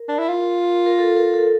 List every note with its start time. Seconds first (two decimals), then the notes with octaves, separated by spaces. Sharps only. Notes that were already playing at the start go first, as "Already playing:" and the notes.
Already playing: A#4
0.09 D4
0.19 E4
0.28 F4
0.86 A#4
0.99 A4
1.17 A#4
1.34 A4